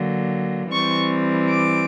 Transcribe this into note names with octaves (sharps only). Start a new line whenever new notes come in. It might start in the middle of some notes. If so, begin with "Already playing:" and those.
Already playing: D3 F#3 A#3
E3 G3 C4 C#6
D6